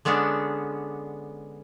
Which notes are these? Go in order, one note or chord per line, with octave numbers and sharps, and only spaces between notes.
D3 G#3 B3 C#4 D4